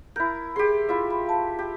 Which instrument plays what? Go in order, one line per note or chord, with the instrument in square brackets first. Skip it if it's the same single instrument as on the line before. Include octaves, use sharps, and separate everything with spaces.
[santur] E4 A#4 [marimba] G6
[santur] G4 C6 [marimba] G#4
[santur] E4 F4 E5
[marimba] B5
F5 A5
[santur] G4